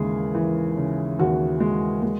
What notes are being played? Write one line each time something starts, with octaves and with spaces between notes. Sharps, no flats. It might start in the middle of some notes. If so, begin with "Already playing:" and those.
Already playing: D#2 C#3 E3 G#3 G#4
E3
C#3
D#2 F#4
G#3
G#3